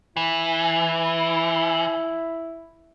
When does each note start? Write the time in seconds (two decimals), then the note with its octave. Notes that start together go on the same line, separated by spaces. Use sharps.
0.17 E3 E4